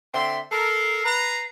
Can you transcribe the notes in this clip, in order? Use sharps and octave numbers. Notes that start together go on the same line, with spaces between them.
D3 C4 E5 C6
A4 A#4 C7
B4 A#5